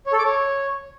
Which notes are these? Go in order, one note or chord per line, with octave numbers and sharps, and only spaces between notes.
C#5
A4
D6
C#5